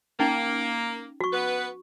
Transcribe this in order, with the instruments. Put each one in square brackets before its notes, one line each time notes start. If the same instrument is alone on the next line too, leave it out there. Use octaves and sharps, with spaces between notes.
[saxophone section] A#3 [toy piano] C#4 D#4
[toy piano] F#4 C#6
[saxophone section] B3 B4